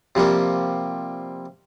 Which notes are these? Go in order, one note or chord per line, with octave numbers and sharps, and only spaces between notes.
C3 F3 G3 A#3